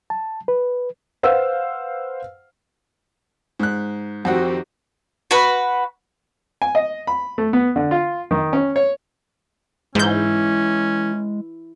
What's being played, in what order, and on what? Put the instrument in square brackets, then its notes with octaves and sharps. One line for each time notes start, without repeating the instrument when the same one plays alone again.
[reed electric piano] A5
B4
[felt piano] B4 C5 F5 F#5 E6
[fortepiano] G#2 F#6
[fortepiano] F2 C4 F#5 [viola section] D#3 F#4 G4
[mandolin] F#4 B4
[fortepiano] G#5
D#5
B5
A3
B3
D3
F4
D#3
C#4
C#5
[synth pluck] G#2 G6 [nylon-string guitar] E3 [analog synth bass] G#3 [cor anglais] C#4